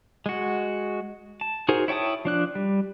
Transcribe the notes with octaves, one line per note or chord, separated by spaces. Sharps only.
G#3 F#4
A5
D#4 F#4 G#4 A#4 C5
E4 C#5 G5 A5 D#6
F3 D4 F#6
G3